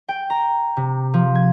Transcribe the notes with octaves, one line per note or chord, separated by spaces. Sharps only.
G5
A#5
C3
F3
G#6